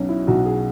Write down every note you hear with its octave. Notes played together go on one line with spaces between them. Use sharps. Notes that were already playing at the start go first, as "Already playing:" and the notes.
Already playing: B1 B2 F#3 C#4
E4
B1 B2 F#3 F#4
G#4